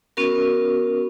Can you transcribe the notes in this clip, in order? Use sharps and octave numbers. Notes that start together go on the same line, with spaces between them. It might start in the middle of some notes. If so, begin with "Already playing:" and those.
B3 C#4 F#4 A#4